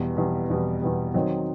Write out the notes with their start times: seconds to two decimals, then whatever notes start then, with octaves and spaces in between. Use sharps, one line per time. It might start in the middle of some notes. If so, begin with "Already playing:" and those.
Already playing: E2 B2 G3
0.17 E2 B2 G3
0.50 E2 B2 G3
0.82 E2 B2 G3
1.14 D#3 F#3 C4 D#4